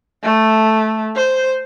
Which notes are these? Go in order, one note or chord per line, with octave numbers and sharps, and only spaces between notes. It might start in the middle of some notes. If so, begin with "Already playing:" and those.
A3
C5